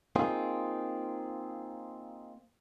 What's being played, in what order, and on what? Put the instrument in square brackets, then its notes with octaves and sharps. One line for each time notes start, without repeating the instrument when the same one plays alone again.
[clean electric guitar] A#3 C4 D#4 F4 G#4